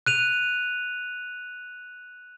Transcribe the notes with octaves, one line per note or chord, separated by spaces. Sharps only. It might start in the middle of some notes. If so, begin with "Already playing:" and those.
F#6 D#7 F7